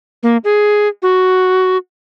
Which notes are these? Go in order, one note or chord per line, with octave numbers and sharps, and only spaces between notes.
A#3
G#4
F#4